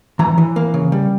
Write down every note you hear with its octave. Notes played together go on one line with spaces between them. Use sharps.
E3 A#5
E3
A#3
C#3
G3